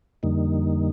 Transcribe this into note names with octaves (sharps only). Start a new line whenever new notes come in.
F2 D3 G3 A#3 D#4